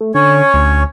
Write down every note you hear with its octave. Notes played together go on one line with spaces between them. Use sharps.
A3
D3 C#4 C#5
D2